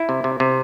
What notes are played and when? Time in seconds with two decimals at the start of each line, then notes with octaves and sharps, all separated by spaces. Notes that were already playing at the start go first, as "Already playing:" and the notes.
Already playing: E4
0.09 C3
0.24 C3
0.40 C3